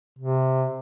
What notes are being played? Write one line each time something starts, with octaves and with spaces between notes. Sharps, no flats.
C3